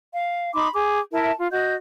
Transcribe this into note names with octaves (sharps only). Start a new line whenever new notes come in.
F5
D#4 B5 C6 D6
G#4 D6
E4 A#4 E5 A5
F4
F#4 D#5 G6